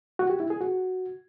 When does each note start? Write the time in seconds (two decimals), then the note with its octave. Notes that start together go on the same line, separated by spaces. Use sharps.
0.19 F#4
0.30 G4
0.40 E4
0.50 G#4
0.61 F#4